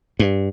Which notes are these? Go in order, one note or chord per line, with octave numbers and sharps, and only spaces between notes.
G2